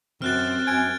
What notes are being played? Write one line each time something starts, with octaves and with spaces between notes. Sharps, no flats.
F#2 C4 F6 F#6 A6
F#2 G#5 G#6 D7